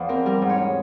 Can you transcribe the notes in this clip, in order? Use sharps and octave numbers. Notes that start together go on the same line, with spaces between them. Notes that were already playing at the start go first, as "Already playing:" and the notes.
Already playing: E2 E3 F3
C4 A#4
G3 A#4
G#2
C#5
C#4